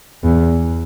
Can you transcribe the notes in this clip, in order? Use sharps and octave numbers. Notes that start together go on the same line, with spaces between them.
E2